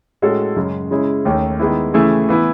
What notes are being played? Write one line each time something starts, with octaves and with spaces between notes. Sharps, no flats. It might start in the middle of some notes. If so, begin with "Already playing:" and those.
A2 G#3 C#4 F#4 A4
F#2 C#3 G#3
C#3 G#3 C#4 E4 G#4
D#2 D#3 A3 C#4
D#3 G#3 B3 E4
C#3 E3 A3 E4 G#4
E3 B3 E4